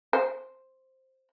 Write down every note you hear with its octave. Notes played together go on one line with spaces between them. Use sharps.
C5